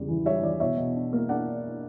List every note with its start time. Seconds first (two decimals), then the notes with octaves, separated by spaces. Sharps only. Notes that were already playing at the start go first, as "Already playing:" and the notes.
Already playing: E2 C#3 G3
0.08 E3
0.25 G3 C#5 E5
0.43 E3 D5
0.60 B2 C#5 E5
0.77 B2
0.95 D4
1.13 A#3
1.29 D4 D5 F#5